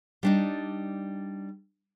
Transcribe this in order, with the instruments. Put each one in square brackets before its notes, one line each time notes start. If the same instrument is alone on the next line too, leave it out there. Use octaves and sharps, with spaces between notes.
[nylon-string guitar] G3 D4 D#4